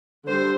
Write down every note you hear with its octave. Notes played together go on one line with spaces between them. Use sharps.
D3 G3 C5